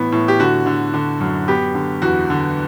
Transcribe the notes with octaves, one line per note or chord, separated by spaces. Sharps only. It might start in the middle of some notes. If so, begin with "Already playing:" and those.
Already playing: A2 E3 B3
A2
G4
D3 F#4
D3
D3
F#2
B3 G4
D3
E2 F#4
D3